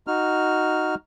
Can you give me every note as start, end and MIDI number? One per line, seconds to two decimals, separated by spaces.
0.07 0.95 63
0.07 0.95 66
0.07 0.95 89